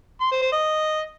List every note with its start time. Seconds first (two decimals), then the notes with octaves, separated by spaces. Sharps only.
0.21 C6
0.32 C5
0.42 C5
0.52 D#5